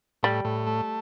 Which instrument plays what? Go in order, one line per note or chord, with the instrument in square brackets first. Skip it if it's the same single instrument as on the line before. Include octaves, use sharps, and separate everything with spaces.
[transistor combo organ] A2 [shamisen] G3
[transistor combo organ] A2
A3